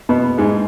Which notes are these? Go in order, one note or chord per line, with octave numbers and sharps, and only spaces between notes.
B2 B3
G#2 G#3